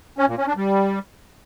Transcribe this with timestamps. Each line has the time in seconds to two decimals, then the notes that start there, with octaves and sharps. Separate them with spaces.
0.18 C#4
0.28 A#2
0.38 C#4
0.47 D4
0.57 G3